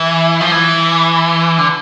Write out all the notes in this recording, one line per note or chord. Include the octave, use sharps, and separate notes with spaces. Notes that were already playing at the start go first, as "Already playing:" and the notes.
Already playing: E3
F3
E3
D3